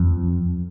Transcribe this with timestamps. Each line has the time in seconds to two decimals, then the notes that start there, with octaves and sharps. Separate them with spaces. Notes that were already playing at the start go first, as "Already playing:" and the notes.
Already playing: F2